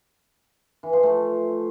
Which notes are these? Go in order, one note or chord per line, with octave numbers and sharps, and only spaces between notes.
E3
F3
A3